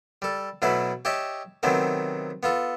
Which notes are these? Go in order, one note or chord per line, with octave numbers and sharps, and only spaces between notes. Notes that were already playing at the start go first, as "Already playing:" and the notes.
G3 A4
B2 F#3 A3 E4 B4
G4 C#5 D#5 E5 A5
C3 D#3 F#3 A3 B3 C4
B3 F4 A4